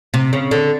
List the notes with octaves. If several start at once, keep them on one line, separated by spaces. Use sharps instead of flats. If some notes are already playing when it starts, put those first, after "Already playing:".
C3
C#3
D3